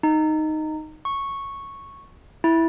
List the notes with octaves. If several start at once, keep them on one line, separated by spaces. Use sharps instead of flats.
D#4
C#6
E4